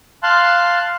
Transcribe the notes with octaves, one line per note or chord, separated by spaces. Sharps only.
F5 A5 C6 F#6